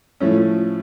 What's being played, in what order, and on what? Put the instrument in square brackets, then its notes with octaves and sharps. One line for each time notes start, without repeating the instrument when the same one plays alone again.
[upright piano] A2 F3 A3 C#4